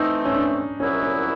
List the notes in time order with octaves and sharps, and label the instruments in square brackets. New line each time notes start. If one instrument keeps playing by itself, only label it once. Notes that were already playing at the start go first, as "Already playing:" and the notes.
Already playing: [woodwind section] E3 A3 C4 [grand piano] D#4
[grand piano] C#4
D4
[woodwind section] C2 A#2 F#3 B3 E4 [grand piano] C#4
[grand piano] C#4